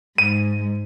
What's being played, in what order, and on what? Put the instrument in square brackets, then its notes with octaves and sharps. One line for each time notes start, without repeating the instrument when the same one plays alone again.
[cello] G#2 [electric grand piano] D#7